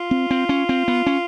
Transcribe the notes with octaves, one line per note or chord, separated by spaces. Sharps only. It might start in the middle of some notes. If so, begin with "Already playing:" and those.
Already playing: F4
C4
C4
C#4
C4
B3
C#4